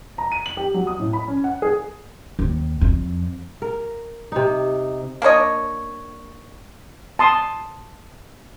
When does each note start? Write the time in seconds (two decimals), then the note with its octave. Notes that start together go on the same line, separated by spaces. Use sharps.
0.18 A#5
0.32 D#7
0.46 F#7
0.57 G4
0.74 F#3
0.87 D#6
1.00 A2
1.13 B5
1.28 C#4
1.44 F#5
1.62 G#4
2.39 D#2
2.81 F2
3.62 A#4
4.32 C3 D#4
5.22 A#3 D4 C#5 D#5
7.19 A5 C6 D#6